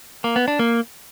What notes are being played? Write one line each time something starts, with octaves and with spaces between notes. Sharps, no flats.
A#3
B3
D4
A#3